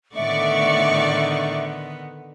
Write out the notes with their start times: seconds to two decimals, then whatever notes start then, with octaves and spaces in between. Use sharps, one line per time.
0.16 A2 D3 D#3 B3 D5 E5 C#6